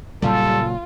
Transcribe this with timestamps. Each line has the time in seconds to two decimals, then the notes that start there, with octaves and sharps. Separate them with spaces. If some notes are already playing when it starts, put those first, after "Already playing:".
0.22 A#2 C#3 F#3 G3 F4 A4